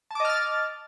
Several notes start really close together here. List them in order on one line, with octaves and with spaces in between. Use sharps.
A5 D6 D#5 F6 A6